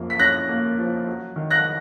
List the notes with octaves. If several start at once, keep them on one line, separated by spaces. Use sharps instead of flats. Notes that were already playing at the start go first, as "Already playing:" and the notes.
Already playing: F#2 F3 A#3
B6
C#4 F#6 A#6
A#3
F3
F#3
D#3
F#6 A#6